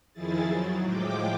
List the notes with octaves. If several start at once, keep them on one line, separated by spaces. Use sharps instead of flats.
F2 D#3 F3 E4 G#4 A6
F#3
A2 F3 G#3 G5 D6